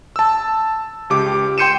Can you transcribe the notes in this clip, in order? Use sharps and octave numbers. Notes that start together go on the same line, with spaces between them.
A5 E6
C#2 G4 D6
G5 C6 G6 C#7 D#7 E7